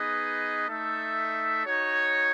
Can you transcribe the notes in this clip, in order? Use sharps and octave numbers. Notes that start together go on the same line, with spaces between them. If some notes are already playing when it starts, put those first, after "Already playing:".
Already playing: B3 D#4 G#4 B4 D#5
A3 D#4 A4 E5
D#4 F#4 C#5